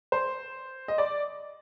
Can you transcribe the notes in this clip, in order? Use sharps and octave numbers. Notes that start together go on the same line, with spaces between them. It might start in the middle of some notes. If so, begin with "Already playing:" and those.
C5
D#5
D5